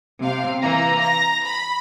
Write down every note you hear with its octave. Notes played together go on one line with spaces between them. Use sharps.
C3 F5
E3 A#3 A#5
A#6
B5